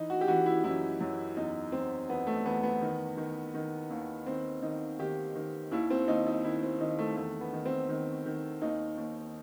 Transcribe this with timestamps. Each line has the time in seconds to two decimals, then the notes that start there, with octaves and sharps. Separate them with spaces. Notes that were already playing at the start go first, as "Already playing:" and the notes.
Already playing: E3 D#4
0.10 F#4
0.21 G4
0.27 E3 F#4
0.46 E4
0.64 F#2 E4
1.01 F#2
1.37 E2 D#4
1.72 E2 C4
2.09 E2 B3
2.27 A3
2.45 E2 B3
2.63 B3
2.81 D#3
3.17 D#3
3.54 D#3
3.90 D#2
4.26 D#3 C4
4.62 D#3 D#4
4.99 D#3 G4
5.35 D#3
5.71 D#2 E4
5.90 C4
6.08 D#2 D#4
6.27 D#4
6.44 D#3 E4
6.63 C4
6.80 D#3 D#4
6.99 A3
7.16 E2 A3
7.41 B3
7.53 D#3
7.66 C4
7.89 D#3
8.26 D#3
8.62 D#2 D#4
8.98 D#2